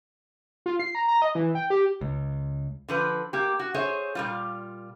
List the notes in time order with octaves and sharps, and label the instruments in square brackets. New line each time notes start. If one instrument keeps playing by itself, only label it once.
[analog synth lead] F4
C7
A#5
A#5
D#5
E3
G5
G4
[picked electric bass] C#2
[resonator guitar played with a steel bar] D3 F3 B4
A#3 G4
F#4
G#4 C5 C#5 E5
A#2 G3 F4